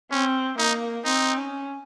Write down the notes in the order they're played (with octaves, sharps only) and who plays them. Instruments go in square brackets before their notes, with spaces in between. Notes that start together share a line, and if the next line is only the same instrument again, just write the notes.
[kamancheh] C4 [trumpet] C#4
[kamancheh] A#3 [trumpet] D#4
[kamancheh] C4 [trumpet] D#4
[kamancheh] C#4